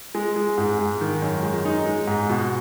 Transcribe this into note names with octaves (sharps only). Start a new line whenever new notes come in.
G#3
G#3
G#2
G#2
D#3
F#2
G#3
D#4
G#3
G#2
B2